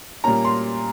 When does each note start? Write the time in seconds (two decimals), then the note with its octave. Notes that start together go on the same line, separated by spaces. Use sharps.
0.24 A#2 G3 A#3 C#4 A#5
0.45 C6